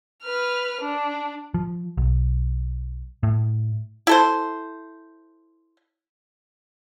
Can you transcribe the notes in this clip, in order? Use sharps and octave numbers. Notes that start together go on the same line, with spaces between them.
B4 F6
D4
F3
B1
A2
E4 A4 C5